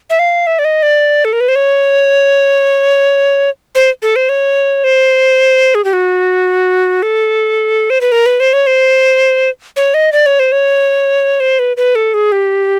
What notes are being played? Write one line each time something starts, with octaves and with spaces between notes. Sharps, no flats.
E5
F5
E5
D5
D#5
D5
A4
A#4
B4
C5
C#5
C5
A4
C5
C#5
C5
G#4
G4
F#4
A4
C5
B4
A#4
B4
C5
C#5
C5
C#5
D#5
D5
C#5
C5
C#5
C5
B4
B4
A4
G#4
G4